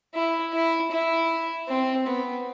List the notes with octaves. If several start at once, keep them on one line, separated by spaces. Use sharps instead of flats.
E4
E4
E4
C4
B3